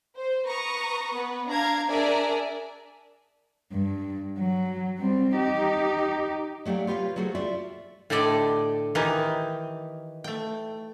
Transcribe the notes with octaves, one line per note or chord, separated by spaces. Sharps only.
C5
B4 A#5 C#6 D#6
B3 B4
D4 F5 A#5 G#6
D4 G#4 A#4 D5 E5 G#5
G2
F#3
G3 C4
D#4 G4
F#3 A3 G4 D5 F5
F4 G4 B4 C#5 F5
F#3 A3 F#4 G#4 C5
F4 F#4 D5 E5
A2 D3 G4 A4 D5 D#5
D#3 E3 D#4 G4
A3 G5